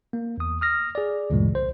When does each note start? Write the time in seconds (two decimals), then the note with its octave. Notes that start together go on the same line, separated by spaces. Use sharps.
0.13 A#3
0.38 E2 D#6
0.61 D#6 F6 A#6
0.95 G#4 D5
1.30 D2 G2 A#2 C#3 E3 G#3
1.53 C2 C5